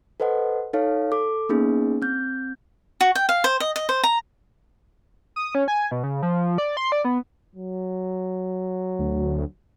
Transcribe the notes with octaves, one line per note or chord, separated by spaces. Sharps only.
A4 B4 C5 D#5 F#5
D#4 A4 C#5 F5
A4 D6
A#3 B3 C#4 D#4 G#4
C4 G6
F#4
G5
F5
C5
D#5
D#5
C5
A#5
D#6
C#4
G#5
B2
C#3
F3
D5
C6
D5
B3
F#3
D2